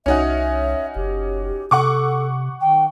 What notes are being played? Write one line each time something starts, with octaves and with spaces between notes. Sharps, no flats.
C2 C#4 D#4 F#4 E5
F#1 G4
C3 A4 F#5 C#6 D6
D#3 G5